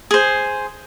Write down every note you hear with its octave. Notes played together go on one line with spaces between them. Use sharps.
G#4 C5